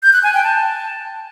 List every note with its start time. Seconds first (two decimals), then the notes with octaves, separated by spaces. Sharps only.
0.03 G6
0.13 F#6
0.23 G#5
0.34 G5
0.44 A5